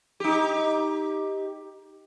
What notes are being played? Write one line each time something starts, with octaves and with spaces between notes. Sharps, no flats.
D#4 G4